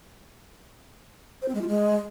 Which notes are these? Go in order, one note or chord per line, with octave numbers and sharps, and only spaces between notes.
C5
C4
G#3
F4
G#3